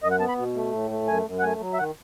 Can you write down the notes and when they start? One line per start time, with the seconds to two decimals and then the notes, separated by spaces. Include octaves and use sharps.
0.02 F#2 D#5
0.11 F#5
0.20 B3 A5
0.29 B5
0.38 B2
0.55 A3
0.72 A2
0.91 A3
1.07 F#2 G#5
1.26 F#2
1.39 F#5
1.43 A3 G#5
1.61 F#3
1.73 E5
1.78 D#3 F#5